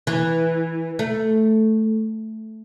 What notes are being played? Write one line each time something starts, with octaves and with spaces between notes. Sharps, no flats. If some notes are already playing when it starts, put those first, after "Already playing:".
E3
A3